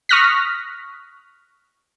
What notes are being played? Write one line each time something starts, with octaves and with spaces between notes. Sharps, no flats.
C#6 D#6 F6 F#6 A#6 B6